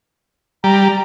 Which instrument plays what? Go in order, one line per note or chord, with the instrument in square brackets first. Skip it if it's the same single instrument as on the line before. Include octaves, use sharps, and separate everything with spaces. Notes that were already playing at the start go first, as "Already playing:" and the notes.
[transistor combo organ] G3 [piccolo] A#5